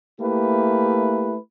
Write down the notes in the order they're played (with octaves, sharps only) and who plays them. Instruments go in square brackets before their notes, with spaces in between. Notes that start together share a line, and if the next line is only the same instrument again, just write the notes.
[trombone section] A3 A#3 E4 G4 B4